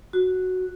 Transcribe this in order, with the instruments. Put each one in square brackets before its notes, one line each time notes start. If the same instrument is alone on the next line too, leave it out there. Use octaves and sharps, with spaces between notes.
[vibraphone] F#4